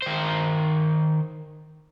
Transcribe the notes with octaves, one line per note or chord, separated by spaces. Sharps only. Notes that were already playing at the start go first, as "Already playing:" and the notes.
D#3 C5